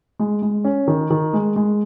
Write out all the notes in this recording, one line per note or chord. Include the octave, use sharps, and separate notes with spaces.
G#3
G#3
C#4
D#3
D#3
G#3
G#3